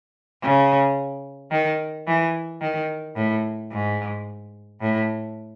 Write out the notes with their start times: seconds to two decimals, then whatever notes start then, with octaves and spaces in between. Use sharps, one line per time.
0.43 C#3
1.51 D#3
2.07 E3
2.61 D#3
3.16 A2
3.72 G#2
4.81 A2